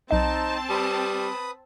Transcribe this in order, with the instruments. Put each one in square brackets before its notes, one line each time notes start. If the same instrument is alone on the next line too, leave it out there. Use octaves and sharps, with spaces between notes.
[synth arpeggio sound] B1 D#5 [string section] C4 A5 [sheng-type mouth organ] D#4
[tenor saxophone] G3 [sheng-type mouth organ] B4 B5 D#6